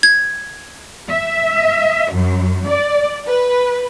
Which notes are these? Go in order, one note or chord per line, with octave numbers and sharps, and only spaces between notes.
G#6
E5
F#2
D5
B4